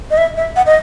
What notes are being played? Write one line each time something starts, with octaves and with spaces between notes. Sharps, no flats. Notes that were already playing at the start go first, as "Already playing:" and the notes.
D#5
E5
E5
F#5
D#5